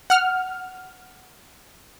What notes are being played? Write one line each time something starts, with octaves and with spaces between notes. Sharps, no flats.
F#5 F6